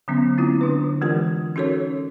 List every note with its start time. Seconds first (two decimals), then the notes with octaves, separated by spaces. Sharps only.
0.08 D3 F#3 B3 C#4
0.38 A3 C4 E4 F4
0.61 D3 D4 B4
1.01 E3 G#3 F4 G4 A#4
1.56 C#4 D#4 F#4 A4 A#4 C#5